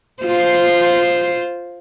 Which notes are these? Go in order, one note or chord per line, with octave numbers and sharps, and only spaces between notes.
F4 C5